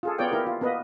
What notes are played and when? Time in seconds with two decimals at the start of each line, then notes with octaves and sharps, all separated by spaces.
0.03 F4 G#4 A4
0.19 B3 F4 C#5 D5 G5
0.31 A#3 E4 G4 A#4
0.47 F4
0.61 A#3 B3 B4 D#5